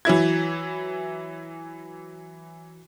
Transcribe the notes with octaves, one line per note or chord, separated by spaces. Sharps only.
E3 F#3 E4 G#6